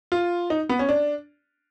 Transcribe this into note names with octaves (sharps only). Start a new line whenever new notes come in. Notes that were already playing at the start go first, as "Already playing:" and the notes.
F4
D#4
B3
C#4
D4